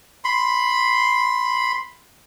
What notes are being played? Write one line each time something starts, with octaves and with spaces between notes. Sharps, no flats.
B5 C6